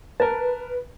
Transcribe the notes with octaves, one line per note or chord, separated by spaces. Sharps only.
A#4 B4 A5